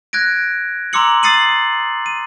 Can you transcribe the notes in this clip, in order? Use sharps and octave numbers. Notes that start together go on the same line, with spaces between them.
F#6 G#6 A#6 D7
A#5 C6 D6 E6 C#7 F#7
D#6 A6 C7 C#7 D#7 F#7
D#7